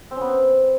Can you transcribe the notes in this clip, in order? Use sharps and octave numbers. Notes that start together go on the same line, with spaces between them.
C4
C#4
B3
C4